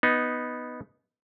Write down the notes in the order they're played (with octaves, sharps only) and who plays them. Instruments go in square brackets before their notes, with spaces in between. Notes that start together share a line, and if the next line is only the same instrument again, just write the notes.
[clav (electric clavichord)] B3 D#4